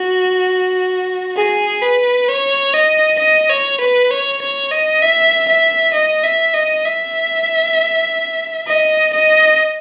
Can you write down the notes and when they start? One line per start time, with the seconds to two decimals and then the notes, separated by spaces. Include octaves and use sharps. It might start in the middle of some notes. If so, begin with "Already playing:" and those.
Already playing: F#4
1.37 G#4
1.82 B4
2.28 C#5
2.74 D#5
3.19 D#5
3.50 C#5
3.80 B4
4.11 C#5
4.42 C#5
4.72 D#5
5.02 E5
5.48 E5
5.94 D#5
6.24 E5
6.54 D#5
6.85 E5
8.67 D#5
9.13 D#5